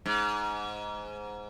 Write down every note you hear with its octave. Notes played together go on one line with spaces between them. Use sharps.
G#2